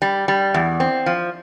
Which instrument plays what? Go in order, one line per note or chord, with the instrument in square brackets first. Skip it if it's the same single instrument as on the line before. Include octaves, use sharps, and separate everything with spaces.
[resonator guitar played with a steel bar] G3
G3
E2
C4
F3